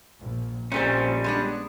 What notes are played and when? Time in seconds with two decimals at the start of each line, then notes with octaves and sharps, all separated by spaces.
0.21 A#1
0.72 A#1 A#2 G3 C4 C#4 C5
1.24 G#3 B3 D4